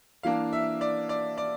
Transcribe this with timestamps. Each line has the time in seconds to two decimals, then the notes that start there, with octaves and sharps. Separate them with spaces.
0.23 E3 A#3 D4 F5
0.53 E5
0.81 D5
1.09 D5
1.38 D5